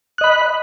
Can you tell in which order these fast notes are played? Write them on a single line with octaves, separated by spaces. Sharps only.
F#6 D#5 B5